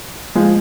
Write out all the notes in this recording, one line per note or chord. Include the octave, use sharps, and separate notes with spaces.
F3 G#3